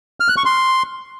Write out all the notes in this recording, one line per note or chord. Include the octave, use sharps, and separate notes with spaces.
F6
F#6
C#6
C6